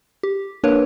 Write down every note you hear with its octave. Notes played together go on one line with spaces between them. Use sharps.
G4
A#3 D4 A#4 B4 C#5